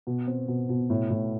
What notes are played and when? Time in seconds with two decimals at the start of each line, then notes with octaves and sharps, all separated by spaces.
0.07 B2
0.27 C4
0.48 B2
0.69 B2
0.90 A2
1.10 A2